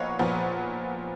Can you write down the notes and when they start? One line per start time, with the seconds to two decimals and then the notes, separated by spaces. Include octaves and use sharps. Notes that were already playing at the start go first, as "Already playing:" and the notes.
Already playing: A#2 F3 B3 B4 C#5 D#5 F5 F#5
0.19 A#2 F3 B3